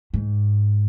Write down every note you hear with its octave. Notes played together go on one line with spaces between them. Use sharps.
G#2